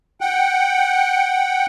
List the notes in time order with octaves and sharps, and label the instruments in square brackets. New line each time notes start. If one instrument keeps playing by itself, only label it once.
[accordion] F#5 G5